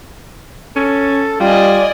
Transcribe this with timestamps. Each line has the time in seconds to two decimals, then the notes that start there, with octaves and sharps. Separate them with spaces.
0.76 C#4 A4
1.40 G3 F4 D5 D#5 G#5